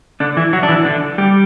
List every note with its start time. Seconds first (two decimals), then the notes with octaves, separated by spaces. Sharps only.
0.20 D3 D4
0.37 E3 E4
0.53 F#3 F#4
0.63 D4
0.69 E3 E4
0.85 D3 D4
1.18 G3 G4